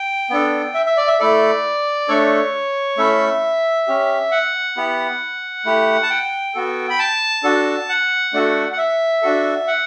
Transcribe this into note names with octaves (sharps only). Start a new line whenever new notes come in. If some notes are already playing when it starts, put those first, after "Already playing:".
Already playing: G5
B3 D4 A4
E5
E5
D5
E5
A3 E4 A4 D5
A3 D4 A4 C#5
A3 C#4 E4 A4 E5
C#4 G4
F#5
B3 E4 G4
A3 E4 G4
A5
G5
B3 F#4 A4
B5
A5
D4 F#4 A4
F#5
A3 D4 F#4 A4
F#5
E5
D4 F#4 A4
F#5